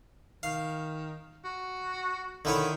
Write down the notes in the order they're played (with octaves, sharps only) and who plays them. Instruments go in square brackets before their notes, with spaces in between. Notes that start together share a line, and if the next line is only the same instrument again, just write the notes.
[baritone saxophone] D#3 [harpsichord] F5
[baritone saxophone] F#4
[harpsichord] D3 E4 C#5 [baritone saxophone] D#3